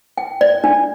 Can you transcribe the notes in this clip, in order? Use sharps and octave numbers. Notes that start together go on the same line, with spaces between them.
G5
D5
D4